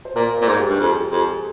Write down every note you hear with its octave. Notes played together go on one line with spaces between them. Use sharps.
C5
A#2 A#4
A#2 C5
G#2
G4
G2
F2 G#4
G#4
F2 G4
G#4